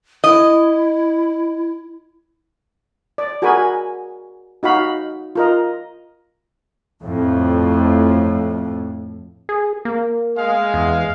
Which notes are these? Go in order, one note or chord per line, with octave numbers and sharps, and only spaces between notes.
E4 D#5
D5
F#4 G#4 A#4 G#5 B5
D#4 F#4 F5 B5
F4 A#4 D#5
F2 A2
G#4
A#3
G#3 F5
E2